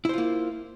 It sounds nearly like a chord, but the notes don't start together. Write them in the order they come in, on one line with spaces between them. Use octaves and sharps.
E4 C5 F4 A#3